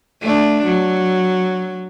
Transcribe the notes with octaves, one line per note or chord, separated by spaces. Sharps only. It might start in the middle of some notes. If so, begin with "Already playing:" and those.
A3 D4
F#3